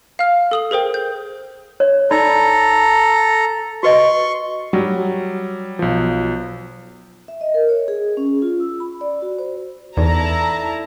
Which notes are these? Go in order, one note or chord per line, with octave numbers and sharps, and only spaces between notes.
F5 F6
A4 D#6 F#7
G#4 A#4 C5 G5
G6
C#5
D#4 A4 D5 A#5 B5
F#4 B4 D#5 C6 C#6
F#3 G3
B1 F3
E5
D#5
A#4
C#5
G#4
C#4
F4
E6
B5
D5
F#4
C5
E2 D#4 E4 A4 D5 A5 A#5